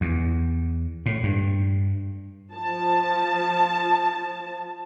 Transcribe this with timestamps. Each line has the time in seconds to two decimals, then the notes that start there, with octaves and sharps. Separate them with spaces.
0.01 E2
1.06 A2
1.23 G2
2.54 F3 A5